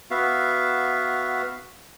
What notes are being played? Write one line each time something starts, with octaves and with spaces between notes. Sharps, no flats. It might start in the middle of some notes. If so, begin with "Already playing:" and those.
B3 F#4 E5 F5